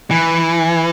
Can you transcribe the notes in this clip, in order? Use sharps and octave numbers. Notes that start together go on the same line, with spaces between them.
E3